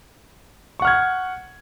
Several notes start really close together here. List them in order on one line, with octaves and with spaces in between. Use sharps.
C#6 F#5 F6 G#6